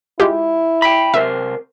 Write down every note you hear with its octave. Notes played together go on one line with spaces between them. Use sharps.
G#3 E4 F4 G4
G5 B5
C3 A#4 C5 E5